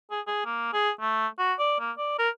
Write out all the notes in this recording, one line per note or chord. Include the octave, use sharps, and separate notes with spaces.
G#4
G#4
A#3
G#4
A3
F#4
D5
A#3
D5
A#4